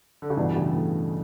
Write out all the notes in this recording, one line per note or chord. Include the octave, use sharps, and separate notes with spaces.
D3
C#3
G2 B2 E3 B3 D4
A2 C#3
A2